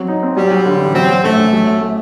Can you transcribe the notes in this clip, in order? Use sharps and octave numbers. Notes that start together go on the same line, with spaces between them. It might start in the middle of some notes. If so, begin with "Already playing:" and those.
Already playing: F#3 C4
D#4
C4
F#3 G3
F#3
D3
A1
F#3 C4
F#3
A#1 A3
A#1
F#3
F#3
A3